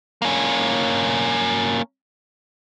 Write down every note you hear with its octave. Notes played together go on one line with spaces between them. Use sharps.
A#3 C#4